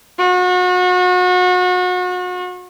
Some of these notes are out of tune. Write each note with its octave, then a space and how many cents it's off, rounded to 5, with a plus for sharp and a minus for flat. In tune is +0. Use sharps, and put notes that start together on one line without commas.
F#4 -35